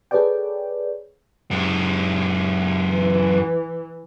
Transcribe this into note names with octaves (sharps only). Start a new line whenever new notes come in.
G#4 A4 B4 C#5 D5 G5
F#2 G#3
E3